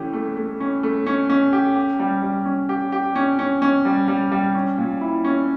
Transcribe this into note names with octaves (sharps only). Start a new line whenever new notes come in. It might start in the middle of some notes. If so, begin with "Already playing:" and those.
Already playing: E3 A3 C#4 G4
A3
A3
C#4
A3
C#4
C#4
G4
G4
G3
G3
C#4
G4
G4
C#4
C#4
C#4
G3
G3
G3
C#4
A#2
E4
C#4